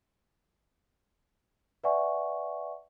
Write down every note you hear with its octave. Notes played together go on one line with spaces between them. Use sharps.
B4 D5 E5 F#5 G#5 C#6